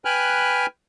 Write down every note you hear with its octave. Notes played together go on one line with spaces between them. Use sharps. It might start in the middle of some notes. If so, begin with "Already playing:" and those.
B4 G5 G#5 B5 F6 F#6